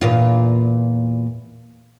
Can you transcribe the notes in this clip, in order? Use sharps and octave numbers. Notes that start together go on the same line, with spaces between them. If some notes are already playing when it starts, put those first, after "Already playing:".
E2 A#2 F4